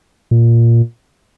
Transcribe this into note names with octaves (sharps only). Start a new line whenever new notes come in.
A#2